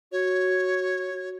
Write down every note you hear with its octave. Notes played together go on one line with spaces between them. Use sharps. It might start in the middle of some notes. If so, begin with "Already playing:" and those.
F#4 C#5